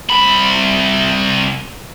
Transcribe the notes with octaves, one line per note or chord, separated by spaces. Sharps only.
C2 B5